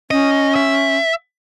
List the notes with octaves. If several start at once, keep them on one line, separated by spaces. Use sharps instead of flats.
C#4 D#5
E5